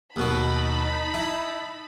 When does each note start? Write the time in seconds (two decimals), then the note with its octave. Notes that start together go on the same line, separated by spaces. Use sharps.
0.16 D#2 B2 B3 D#4 A5 B5
1.14 E4